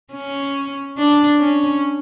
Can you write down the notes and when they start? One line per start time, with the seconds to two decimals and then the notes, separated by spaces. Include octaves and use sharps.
0.13 C#4
0.98 D4
1.39 C#4